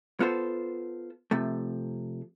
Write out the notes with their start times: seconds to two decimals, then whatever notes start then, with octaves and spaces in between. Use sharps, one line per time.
0.20 B3 F4 A4 C5
1.31 C3 F3 A3